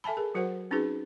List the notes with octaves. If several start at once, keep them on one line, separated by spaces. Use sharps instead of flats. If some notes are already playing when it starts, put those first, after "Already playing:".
A4 E5 G#5 A5 B5
G#4 A#4
F#3 F#4 A#4 C5 F#5
C4 C#4 D#4 F#4 G#4 B4